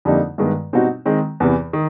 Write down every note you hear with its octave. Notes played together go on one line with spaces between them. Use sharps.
F2 D3 G3 A#3 D#4
G2 D#3 G#3 B3
B2 G3 C4 D#4 F#4
D#3 G#3 C4
E2 C3 E3
D#3